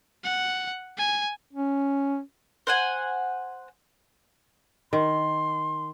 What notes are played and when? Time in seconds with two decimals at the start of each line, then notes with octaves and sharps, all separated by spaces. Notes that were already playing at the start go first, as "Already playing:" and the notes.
0.24 F#5
0.98 G#5
1.53 C#4
2.67 C5 F#5 G#5
4.93 D#3 C6